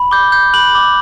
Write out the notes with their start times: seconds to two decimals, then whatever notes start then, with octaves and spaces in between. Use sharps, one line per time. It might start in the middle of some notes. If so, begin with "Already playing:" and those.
Already playing: B5
0.11 D6 G6 G7
0.32 G6
0.54 B5 F#6 F#7
0.75 D6